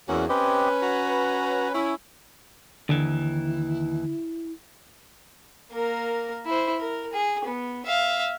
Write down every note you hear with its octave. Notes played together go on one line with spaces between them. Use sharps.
E2 A#3 C#4 F#4
C4 C#4 G4 B4 D#5
F#4 A#5
C#4 E4 C#5
D#2 D3 E3 E4
A#3 A#4
E4 C5
A#4
G#4
B3
E5 F5